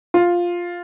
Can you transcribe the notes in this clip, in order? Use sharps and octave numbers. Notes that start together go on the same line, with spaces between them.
F4